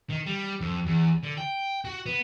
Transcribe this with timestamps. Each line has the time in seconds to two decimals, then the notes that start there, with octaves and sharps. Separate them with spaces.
0.10 D#3
0.26 G3
0.61 F2
0.87 E2
1.24 D3
1.38 G5
1.85 F#4
2.06 B3